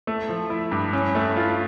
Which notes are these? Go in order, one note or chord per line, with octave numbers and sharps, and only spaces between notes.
A3
F3
E4
G2
C#4
A3
F4